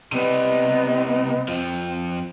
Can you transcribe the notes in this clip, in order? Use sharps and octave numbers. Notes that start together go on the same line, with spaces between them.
C3 G3 B3 D#5
F2 F3 C4